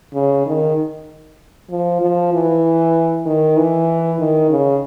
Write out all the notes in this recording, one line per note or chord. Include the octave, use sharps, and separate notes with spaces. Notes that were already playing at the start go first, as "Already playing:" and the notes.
C#3
D#3
F3
F3
E3
D#3
E3
D#3
C#3